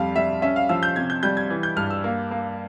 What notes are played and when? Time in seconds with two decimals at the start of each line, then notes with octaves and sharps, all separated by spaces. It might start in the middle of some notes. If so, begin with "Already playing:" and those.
Already playing: F2 G3 F5
0.16 G3 E5
0.42 C#4 E5
0.56 F5
0.69 F3 E6
0.83 G6
0.96 C3 G#6
1.10 G6
1.23 G3 G6
1.37 G#6
1.50 E3
1.63 G6
1.76 G2 F6
1.90 E6
2.04 A#3
2.31 A#3